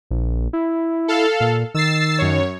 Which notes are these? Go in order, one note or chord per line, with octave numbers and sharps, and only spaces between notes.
A#1
E4
A4 F5
A#2
D#3 E6 A6 C7
F#2 C#5